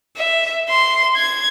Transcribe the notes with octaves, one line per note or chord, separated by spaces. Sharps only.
E5
C6
G#6